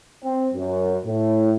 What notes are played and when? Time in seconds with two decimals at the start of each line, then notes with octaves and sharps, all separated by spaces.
0.23 C4
0.54 F#2
1.05 A2